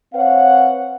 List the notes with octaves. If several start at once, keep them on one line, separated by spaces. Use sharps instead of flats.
C4 B4 C#5 F5 F#5